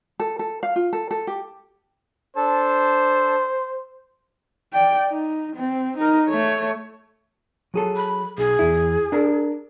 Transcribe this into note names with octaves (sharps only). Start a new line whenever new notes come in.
A4
A4
F5
F4
A4
A4
G4
D4 A4 C5 A5
D5 G5
D#4
C4
D#4 A#4
A3 C#5
F#3 G#4 A4
B5
B1 G#4
E2 E4
D4 A#4